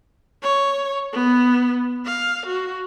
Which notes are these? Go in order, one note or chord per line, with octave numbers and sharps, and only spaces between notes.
C#5
B3
F5
F#4